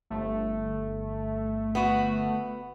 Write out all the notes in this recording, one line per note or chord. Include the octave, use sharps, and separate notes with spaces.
G1 A3
B3 F#4